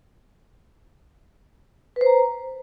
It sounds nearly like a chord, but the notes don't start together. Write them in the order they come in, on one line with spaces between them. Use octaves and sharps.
B4 C5 A#5